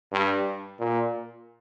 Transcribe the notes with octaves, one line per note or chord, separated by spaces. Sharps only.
G2
A#2